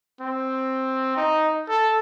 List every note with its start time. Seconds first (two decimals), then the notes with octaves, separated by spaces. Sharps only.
0.21 C4
1.17 D#4
1.69 A4